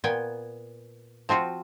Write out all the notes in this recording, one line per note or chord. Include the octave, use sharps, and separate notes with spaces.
A#2 B3 G5 G#5
F3 C4 F4 F#4